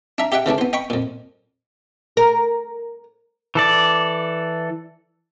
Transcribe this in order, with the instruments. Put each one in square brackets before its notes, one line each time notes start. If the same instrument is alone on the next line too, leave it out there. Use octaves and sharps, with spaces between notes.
[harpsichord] D4 E5 A#5
G4 D#5 E5 F#5 G5
C#3 E3 A3 D4
B3 C5
D#5 G5 B5 C#6
F2 A#2
[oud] A#4
[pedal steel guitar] E3 A4 D5